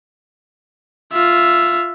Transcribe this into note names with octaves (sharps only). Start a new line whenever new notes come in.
F4 E5